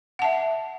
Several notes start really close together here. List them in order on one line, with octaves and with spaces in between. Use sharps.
F#5 A5 E5